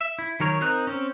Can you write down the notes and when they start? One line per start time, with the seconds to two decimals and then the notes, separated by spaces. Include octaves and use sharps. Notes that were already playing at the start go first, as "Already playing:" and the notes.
0.01 E5
0.19 E4
0.40 D#3 F#3 A#4 C#5
0.61 C4 D#4 A#4 F#6
0.87 C4 C#4